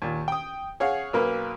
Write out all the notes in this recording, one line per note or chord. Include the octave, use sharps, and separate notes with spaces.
D#2 A#2
G5 D#6
G#4 C#5 F5 F#5
B1 F#3 A#3 A#4 B4